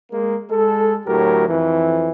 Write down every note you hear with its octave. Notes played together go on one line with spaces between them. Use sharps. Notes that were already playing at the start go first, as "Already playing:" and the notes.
G#3 A#3
G#3 A4
D2 A2 F#3 G4 A#4
F2 E3